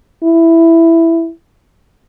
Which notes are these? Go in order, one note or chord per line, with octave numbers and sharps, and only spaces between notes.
E4